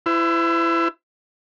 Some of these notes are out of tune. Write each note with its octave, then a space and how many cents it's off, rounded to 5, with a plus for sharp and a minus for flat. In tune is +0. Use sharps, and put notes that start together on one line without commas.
E4 +20 C5 -45